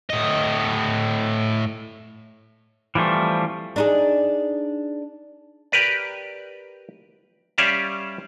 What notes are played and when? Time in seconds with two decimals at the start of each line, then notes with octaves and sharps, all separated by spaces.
0.10 A2 D#5
2.95 E3 F3 G3 A3 C4
3.76 D4 D#4 G#4
5.72 G4 A#4 B4 D5
7.58 G3 C#4 G4 D5 E5 F5